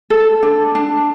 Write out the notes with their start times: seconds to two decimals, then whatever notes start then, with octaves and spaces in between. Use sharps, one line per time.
0.10 A4
0.43 D4
0.75 D4